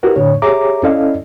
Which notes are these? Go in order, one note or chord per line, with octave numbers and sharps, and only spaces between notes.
E4 F#4 G4 A#4 B4
A2 D3 D4 C#5
G4 G#4 C#5 E5 A#5 D6
C#4 E4 A4 D5 D#5 F5